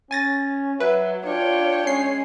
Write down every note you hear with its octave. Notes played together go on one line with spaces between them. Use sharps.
C#4 G#5 A6 A#6
F#3 B4 E5
D4 F4 C#5 G5
G#3 C#4 C7